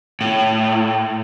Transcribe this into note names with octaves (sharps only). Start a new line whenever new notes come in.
A2